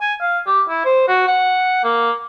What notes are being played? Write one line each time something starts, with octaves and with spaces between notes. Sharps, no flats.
G#5
F5
G4
E4
C5
F#4
F#5
A#3